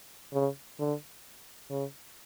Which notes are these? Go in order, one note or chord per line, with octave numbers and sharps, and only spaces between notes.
C#3
D3
C#3